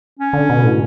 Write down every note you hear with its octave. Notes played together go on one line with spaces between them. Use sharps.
C#4
D3
B2
A2